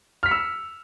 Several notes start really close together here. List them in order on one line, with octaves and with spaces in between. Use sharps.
F6 B6 C#7 E6